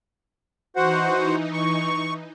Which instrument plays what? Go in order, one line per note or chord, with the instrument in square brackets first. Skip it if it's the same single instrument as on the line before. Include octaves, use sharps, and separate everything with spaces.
[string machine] E3 D#4 [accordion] F#4 C5 F#5
[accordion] C#6